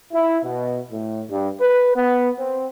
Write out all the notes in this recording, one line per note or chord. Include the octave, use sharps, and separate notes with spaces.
E4
B2
A2
G2
B4
B3
C4